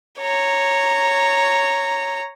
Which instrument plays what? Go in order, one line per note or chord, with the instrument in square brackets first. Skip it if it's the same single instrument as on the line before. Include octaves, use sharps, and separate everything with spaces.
[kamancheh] C#5 A#5